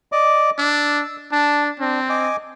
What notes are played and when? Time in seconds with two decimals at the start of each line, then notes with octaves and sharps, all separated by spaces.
0.12 D5 D#5 D6
0.58 D4 E6
1.32 D4 A5
1.80 C4 D4
2.09 D#5 G#5 D6